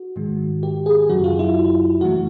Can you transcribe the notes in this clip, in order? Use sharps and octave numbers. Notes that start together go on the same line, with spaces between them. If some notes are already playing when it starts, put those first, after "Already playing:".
Already playing: F#4
G#2 D#3 G#3
G4
G#4
F#2 C#3 F#3 F#4
F4
E4
F2 C#3 E3 A3 F#4